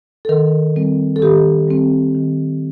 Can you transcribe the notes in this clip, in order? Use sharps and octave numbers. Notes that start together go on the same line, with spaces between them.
A4
D#3 A#4
G3 C4
A4
D#3 G4
G3 C4
D#3